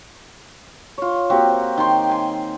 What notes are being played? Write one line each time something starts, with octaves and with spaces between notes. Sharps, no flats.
F4 C#5
A#3 C4 F#4 G4
D#3 G5 C6
G#5 C6